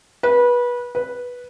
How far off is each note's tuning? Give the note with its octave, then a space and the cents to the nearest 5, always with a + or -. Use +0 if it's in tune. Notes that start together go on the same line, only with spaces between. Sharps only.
B4 -25
B4 -10